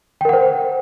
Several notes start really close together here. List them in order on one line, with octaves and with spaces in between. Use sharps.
G5 A#4 F#5 C5